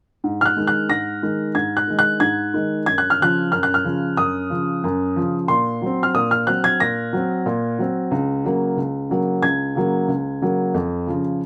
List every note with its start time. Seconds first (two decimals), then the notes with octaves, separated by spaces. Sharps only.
0.24 G#2
0.41 F6
0.46 F#6
0.57 D#3 G#3
0.67 F#6
0.89 G#2 A#6
1.23 D#3 G#3
1.55 G#2 G#6
1.77 F#6
1.88 D#3 G#3
1.99 F#6
2.20 G#2 G#6
2.54 D#3 G#3
2.86 F#2 G#6
2.98 F#6
3.10 F6
3.19 C#3 F3 F#6
3.52 F#2 F6
3.63 F#6
3.74 F6
3.84 C#3 F3
4.17 F#2 D#6
4.50 C#3 F3
4.84 F#2
5.16 C#3 F3
5.48 A#2 C6
5.82 F#3 C4
6.03 F6
6.15 A#2 D#6
6.31 F6
6.47 F#3 C4 F#6
6.64 G#6
6.80 A#2 A#6
7.13 F#3 C4
7.46 A#2
7.79 F#3 C4
8.11 C#2
8.44 C#3 F#3 A#3
8.77 C#2
9.10 C#3 F#3 A#3
9.43 C#2 G#6
9.75 C#3 F#3 A#3
10.08 C#2
10.42 C#3 F#3 A#3
10.74 F2
11.07 C#3 F3